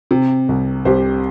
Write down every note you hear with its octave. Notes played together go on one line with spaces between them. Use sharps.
C3
C2
C2 G4 C5